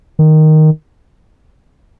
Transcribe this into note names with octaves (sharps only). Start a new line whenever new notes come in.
D#3